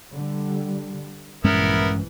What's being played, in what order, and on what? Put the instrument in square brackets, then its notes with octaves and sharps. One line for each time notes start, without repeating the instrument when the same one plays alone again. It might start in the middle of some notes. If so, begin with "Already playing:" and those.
[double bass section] D3 G3
[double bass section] A#1 E3 [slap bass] G2 G#3 C#4 [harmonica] B3 E4 A#4